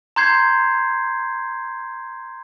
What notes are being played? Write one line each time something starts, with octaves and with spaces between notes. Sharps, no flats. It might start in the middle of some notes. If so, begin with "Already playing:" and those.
A#5 C6 G6 G#6 C7